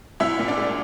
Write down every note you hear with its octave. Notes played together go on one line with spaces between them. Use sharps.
C2 E4 E5
A#2
D4 D5
G#3